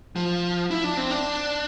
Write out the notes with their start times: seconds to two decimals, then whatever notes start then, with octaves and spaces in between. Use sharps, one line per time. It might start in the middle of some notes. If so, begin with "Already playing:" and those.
0.16 F3
0.71 E4
0.84 D4
0.97 C4
1.11 D4